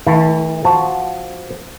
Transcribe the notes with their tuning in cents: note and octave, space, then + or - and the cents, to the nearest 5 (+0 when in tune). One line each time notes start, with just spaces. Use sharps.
E3 -45 A3 +0 E4 +0
F3 +0 F#4 +0 A5 +5